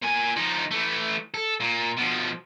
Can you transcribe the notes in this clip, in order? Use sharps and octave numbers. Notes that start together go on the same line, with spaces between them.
A#2 G#5
F3 D#4
E3 A3
A4
A#2
B2 F3